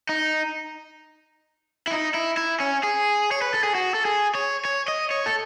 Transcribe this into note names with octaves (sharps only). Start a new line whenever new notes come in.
D#4
E4
D#4
E4
E4
C#4
G#4
C#5
B4
A4
G#4
F#4
A4
G#4
C#5
C#5
D#5
C#5
A4